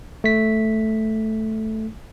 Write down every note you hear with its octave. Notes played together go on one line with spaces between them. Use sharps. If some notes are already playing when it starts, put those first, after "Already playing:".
A3 B6